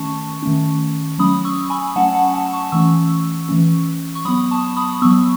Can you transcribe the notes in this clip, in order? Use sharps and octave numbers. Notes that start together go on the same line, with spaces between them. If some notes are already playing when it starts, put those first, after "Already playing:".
Already playing: D#3 A3 C#4 A5 C#6
D#3 A3 C#4
F#3 A3 C#4 B5 D#6
C#6 E6
G#5 B5
F#3 A3 C#4 F#5 A5
F#5 A5
F#5 A5
A5 C#6
E3 A3 C#4 C#6 E6
E3 A3 C#4
C#6
F#3 B3 B5 D#6
A5 C#6
B5 D#6
F#3 B3 C#6 E6